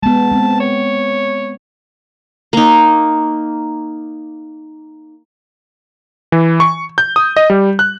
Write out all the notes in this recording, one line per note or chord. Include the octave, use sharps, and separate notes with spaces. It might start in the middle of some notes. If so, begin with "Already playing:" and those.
G#3 B3 A5
G#3 C4
C#5
A#3 D#4
E3
C#6
G6
D#6
D#5
G3
F#6